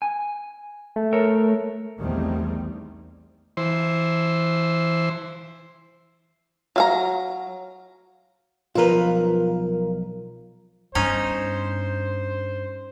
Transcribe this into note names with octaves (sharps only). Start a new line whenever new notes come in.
G#5
A3
A4 A#4 C#5
A#1 E2 D#3 G3 A3 C4
E3 C5
F#3 F5 A#5
B1 F3 F4 A#4 B4
G2 B3 C#4 D#4 C5